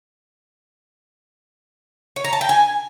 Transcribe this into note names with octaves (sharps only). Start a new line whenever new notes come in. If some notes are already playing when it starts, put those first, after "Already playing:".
C#5
A#5
A5
G5
G#5